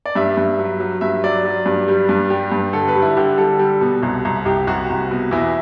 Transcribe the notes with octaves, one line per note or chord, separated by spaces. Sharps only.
D5
G2 E5
G2
F#3
F#3
G2 E5
F#3 D5
F#3
G2
G3
G2
G3 G4
G2
D3 A4
B4
G3
E4
D3 G4
G3 A4
G3
B2
C2
C2
C2 G4
C2 F#4
C2
B2
E2 E4